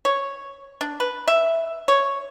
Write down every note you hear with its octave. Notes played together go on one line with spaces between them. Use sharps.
C#5
D4
B4
E5
C#5